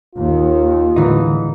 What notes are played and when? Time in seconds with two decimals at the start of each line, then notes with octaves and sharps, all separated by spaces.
0.15 D#2 F4
0.96 A2 D3 E3 G#3 D#4